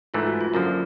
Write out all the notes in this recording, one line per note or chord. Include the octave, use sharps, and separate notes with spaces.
G#2 E3 A3 F4
F#4
F4
F#2 D3 F3 A#3 A#4